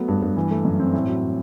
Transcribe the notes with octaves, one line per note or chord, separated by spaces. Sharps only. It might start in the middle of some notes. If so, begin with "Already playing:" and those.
Already playing: F#3 A3 B3
G2
G2
E3
A3
F#2
C4
A2
F#3